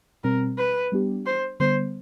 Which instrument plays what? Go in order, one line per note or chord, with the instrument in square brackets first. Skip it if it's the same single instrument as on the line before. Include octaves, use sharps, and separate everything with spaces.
[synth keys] B2 G3 C4 [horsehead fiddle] A#4
[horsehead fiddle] B4
[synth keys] G3 B3 D4 G4
[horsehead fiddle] C5
[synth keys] D3 G3 B3 [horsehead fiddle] C5